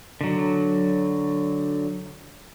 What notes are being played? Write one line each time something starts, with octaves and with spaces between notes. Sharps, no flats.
D3 F#3